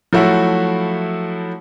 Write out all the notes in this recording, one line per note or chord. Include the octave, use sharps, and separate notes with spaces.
F3 F#3 A3 E4 F#4